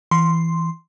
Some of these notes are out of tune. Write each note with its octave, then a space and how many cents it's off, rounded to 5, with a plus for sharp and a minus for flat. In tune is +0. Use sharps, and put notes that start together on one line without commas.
E3 +0 C6 +0